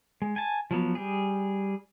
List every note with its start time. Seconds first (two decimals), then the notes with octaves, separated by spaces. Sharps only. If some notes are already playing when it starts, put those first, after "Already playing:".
0.22 G#3
0.36 G#5 A5
0.71 F3 F#3 B3
0.95 G3 G#4